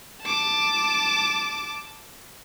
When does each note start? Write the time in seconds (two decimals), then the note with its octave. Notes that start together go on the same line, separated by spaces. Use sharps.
0.22 A5 D6